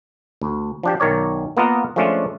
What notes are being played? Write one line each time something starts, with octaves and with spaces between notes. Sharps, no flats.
D2
F3 D4 G4
B1 D#3 A#4 C#5 D5
A#3 B3 F4 A#4 D#5 F#5
F3 G#3 A3 C#4 D4 F4